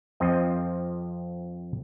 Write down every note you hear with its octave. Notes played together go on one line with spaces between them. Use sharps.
F2 F3 C4 D#5